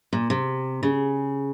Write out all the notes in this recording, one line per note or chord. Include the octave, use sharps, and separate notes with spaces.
A#2
C3
C#3